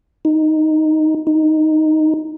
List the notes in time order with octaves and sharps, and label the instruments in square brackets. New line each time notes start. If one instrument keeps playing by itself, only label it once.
[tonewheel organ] D#4
D#4